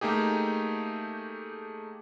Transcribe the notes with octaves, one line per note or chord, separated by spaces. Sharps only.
A3 A#3 D#4 G4 G#4